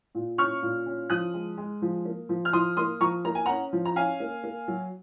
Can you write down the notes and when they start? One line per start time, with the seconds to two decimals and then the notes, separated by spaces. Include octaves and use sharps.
0.15 A#2
0.38 C#4 C#6 F6
0.63 A#2
0.86 C#4
1.10 F3 D#6 F#6
1.34 G#3
1.57 G#3
1.82 F3
2.05 A#3
2.29 F3
2.45 F6
2.53 F3 C6 D#6
2.77 A#3 C6 D#6
3.00 F3 A#5 C#6
3.25 A#3 A#5
3.35 G#5
3.46 C#4 F#5 A#5
3.73 F3
3.85 A#5
3.96 C#4 F5 G#5
4.20 A#3
4.44 A#3
4.68 F#3